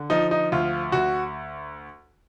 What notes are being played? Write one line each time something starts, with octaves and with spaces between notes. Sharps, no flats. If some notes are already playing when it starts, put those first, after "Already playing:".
Already playing: D3
F3 D#4
D#4
D2 F4
D2 F#4